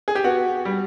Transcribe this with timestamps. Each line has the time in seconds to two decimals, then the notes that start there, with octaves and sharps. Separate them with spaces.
0.08 G#4
0.15 G4
0.24 B3 F#4
0.65 G3